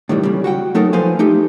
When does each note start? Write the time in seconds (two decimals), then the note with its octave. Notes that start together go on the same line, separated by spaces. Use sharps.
0.09 A2 D#3 E3 G3
0.23 C#3 G3
0.44 F#4 F#5 G5
0.75 F#3 A3 D#4 A4 A#4
0.93 F3 B4 C5 F5 G#5
1.19 A3 D#4 G4